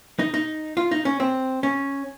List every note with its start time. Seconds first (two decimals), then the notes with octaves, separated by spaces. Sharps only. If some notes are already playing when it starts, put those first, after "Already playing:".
0.19 D#4
0.34 D#4
0.77 F4
0.91 D#4
1.05 C#4
1.20 C4
1.63 C#4